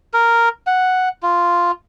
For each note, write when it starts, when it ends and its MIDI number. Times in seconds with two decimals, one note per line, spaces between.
0.14 0.49 70
0.67 1.09 78
1.23 1.71 65